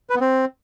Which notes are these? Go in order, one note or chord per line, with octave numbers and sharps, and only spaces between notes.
B4
B3
C4